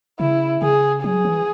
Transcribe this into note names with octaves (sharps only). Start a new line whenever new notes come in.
C#3 E4
C#3 G#4
F#3 G#4
E3